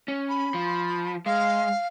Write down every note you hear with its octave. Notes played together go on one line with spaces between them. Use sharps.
C#4
B5
F3
G#3 F5